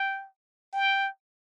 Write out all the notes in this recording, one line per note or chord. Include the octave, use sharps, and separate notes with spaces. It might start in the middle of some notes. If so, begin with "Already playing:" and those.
Already playing: G5
G5